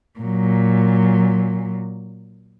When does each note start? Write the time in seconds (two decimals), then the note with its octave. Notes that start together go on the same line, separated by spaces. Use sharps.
0.20 A#2 F#3